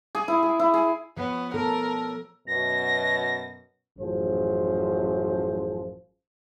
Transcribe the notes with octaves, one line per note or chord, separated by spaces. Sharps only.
G#4
E4
G#4
E4
G#4
F3 B3 C#5
B3 A4 A#4
F#2 B2 A#6
A1 F#2 F3 G#4 C5